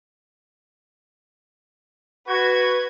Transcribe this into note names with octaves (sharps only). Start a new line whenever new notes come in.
F#4 B4 G#6